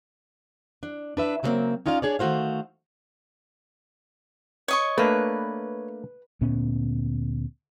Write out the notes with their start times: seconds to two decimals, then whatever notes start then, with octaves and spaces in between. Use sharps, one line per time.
0.83 D4
1.17 D4 B4 E5
1.43 C#3 F#3 G3 A3 A#3 C4
1.86 C#4 D#4 F4 D5 F5
2.02 D4 G#4 C#5 D5
2.19 D#3 A3 F#4 C5 F5
4.68 C#5 D#5 C#6
4.98 A3 A#3 D4 B4
6.41 D2 A#2 B3 C#4